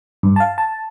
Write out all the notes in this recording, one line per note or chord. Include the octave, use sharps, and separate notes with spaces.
G2
F5 A5
A5